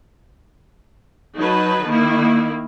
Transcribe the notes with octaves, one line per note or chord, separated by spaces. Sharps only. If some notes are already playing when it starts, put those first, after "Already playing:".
F#3 D#4 B4 A5
D#3 A#3 E4